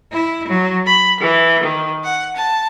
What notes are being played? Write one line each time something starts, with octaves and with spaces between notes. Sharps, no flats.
E4
F#3
B5
E3
D#3
F#5
A5